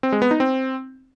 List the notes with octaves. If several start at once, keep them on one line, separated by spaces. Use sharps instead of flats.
C4
G#3
B3
D#4
C4